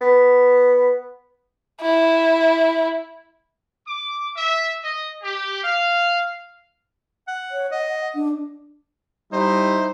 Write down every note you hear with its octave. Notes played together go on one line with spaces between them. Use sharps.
B3
E4
D6
E5
D#5
G4
F5
F#5
C#5
D#5 F#5
D4
G3 D#4 E4 C5